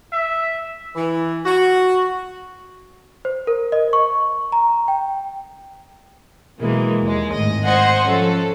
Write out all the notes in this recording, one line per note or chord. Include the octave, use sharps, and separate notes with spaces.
E5
E3
F#4
C5
A#4
D#5
C#6
A#5
G5
B2 E3 F#3 G#3 A#3
D#2 G#3
G#1 A2 D#5
C5 D#5 F#5 G#5
F3 C#4 A4